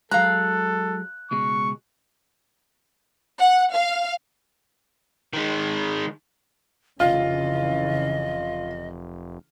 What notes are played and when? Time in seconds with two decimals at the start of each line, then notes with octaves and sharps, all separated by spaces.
0.11 F#3 G#3 A4 F5 A#5 F#6
1.31 C#2 B2 G#3 C#6
3.39 F#5
3.73 F5
5.33 D#3 G#3
7.00 F1 C#3 E3 F4 D#5